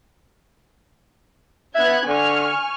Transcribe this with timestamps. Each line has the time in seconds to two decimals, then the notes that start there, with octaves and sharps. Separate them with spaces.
1.75 B3 E5 F#6 G#6
2.08 D3 G#5 C#6 F6